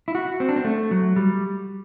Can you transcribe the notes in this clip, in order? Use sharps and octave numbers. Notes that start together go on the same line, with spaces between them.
E4
F#4
C4
D4
C4
A3
F#3
G3